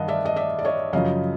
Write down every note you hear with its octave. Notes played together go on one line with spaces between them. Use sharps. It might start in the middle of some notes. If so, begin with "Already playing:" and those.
Already playing: G2 D#3 D#5 F5 F#5 A5
D5 E5
D#5
D5 E5
D5
C#5 D#5
F#2 C#3 F3 D#5 F5